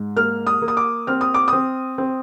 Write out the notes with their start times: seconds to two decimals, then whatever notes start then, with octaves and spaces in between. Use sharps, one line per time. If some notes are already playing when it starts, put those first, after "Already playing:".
Already playing: G#2
0.16 A#3 F6
0.47 D#6
0.62 A#3
0.68 D#6
0.77 D6
1.07 C4 F6
1.21 D#6
1.34 D6
1.48 C4 D#6
1.98 C4